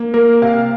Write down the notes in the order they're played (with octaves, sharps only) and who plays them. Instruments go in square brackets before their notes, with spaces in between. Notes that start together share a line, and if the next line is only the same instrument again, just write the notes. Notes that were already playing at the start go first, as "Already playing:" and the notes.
Already playing: [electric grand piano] A#3
A#3 A#4
C3 F5